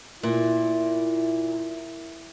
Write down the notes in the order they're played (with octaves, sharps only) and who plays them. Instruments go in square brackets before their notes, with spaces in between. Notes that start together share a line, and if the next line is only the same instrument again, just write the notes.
[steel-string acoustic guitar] A#2 [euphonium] E4